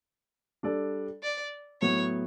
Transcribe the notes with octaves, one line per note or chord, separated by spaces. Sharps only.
G3 D4 A4 D5
D5
A2 F#3 B3 C#5